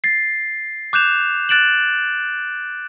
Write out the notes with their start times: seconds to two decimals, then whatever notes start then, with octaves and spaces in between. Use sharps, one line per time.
0.04 A6 C7
0.93 D6 F#6 G6 E7 F7
1.49 F#6 A6 D7 E7 F#7